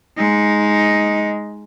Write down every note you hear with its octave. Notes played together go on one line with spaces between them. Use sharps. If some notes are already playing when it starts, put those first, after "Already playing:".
G#3 D#4